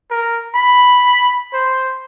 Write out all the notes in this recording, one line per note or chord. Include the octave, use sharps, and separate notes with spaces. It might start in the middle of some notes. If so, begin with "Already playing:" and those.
A#4
B5
C5